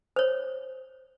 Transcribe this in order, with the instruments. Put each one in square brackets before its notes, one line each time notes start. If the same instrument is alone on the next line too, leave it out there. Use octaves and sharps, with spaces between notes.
[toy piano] C5 C#5